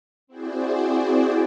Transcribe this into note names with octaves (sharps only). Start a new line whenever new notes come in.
C4 E4 F#4 G#4 C5 D5